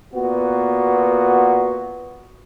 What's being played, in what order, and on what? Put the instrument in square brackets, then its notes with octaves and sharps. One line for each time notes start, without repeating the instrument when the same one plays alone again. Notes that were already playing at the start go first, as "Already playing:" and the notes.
[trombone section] A#2 B3 F#4